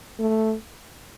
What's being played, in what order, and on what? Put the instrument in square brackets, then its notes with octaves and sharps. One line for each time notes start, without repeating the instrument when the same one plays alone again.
[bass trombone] A3